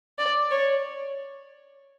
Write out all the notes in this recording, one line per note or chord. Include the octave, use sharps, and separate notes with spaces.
D5
C#5